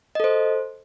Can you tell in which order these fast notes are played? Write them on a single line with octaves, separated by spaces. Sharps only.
D#5 A4 C5